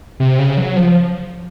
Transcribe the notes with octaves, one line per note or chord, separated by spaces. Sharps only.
C3
C#3
F#3
F3